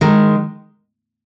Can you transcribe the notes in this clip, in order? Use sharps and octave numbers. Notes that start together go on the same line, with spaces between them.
D#3 G#3